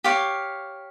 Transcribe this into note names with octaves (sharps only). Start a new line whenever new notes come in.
G4 C#5 F5